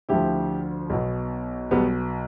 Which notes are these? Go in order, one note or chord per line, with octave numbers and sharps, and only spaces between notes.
D2 D3 F3 E4 G4
B1 B2
B1 B2 G3 B3